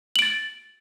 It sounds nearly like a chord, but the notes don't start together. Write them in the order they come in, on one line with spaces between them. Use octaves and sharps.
F#7 D7 A6